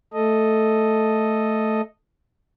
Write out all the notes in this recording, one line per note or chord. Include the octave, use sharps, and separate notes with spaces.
A3 A4 D#5